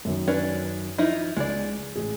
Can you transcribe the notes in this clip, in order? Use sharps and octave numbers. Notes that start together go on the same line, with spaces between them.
F#2 D#3
C#4 D4 B4
F3 D#4 E4
C#2 G#3 D5
A1 G#4